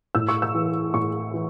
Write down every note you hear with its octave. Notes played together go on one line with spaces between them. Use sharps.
A2 E6
C#6
E6
E3
A2 C#6
E3